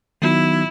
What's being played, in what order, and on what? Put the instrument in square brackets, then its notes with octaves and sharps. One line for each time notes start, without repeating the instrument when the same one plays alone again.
[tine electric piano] D#3 F#3 B3 D#4 F#4 [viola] E4